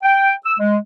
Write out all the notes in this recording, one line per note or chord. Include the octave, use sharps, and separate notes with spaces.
G5
E6
G#3